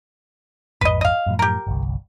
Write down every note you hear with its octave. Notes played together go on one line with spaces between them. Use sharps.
A#1 F2 G#2 B4 D#5
D#5 F5
F#2 A2 F3
G4 A#4
G1 C2